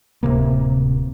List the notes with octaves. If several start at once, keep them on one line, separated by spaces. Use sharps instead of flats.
D1 E2 C3 A#3